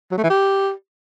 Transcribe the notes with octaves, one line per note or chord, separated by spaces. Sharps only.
F#3
A3
E3
G4